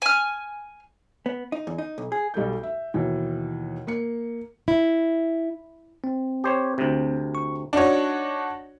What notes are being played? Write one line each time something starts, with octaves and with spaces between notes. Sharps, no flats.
G#5 F6
B3
D#4
E2
D#4
B1
G#4
B1 G3 A4 G6
E5
D#2 B2 E3
A#3 C#7
E4
C4
G4 C5 C#5
D2 C3
C#6
D4 D#4 F#4 C#5